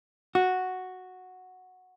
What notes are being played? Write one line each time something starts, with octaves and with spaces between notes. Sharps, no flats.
F#4